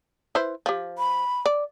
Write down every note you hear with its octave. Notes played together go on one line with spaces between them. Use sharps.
E4 B4 C5
F3 G4
B5
D5